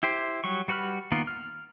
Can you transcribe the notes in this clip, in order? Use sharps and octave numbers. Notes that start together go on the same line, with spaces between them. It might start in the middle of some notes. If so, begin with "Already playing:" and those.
E4 G4 C5
F#3 G3 C#6
G3 F#4 B4 B5 F6
D#3 A#3 B3 F4
F6